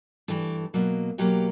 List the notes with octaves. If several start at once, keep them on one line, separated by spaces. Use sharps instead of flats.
G2 E3 A3 G4
B2 F#3 A#3
B2 F#3 A#3 G4